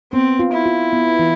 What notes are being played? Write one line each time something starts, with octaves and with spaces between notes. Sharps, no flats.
B3 C4
F4
E4
F4
B3
E3